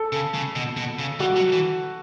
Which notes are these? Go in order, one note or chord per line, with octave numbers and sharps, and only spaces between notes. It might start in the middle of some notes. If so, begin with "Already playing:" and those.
Already playing: A4
C#3
C#3
B2
B2
C#3
G3 F#4
F#3
E3